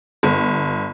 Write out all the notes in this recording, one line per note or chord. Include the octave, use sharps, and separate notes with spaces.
G1